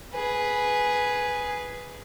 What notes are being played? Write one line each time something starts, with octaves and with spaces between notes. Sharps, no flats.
G#4 B4